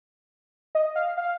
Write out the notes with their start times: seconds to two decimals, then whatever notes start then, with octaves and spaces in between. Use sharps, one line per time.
0.75 D#5
0.95 F5
1.17 F5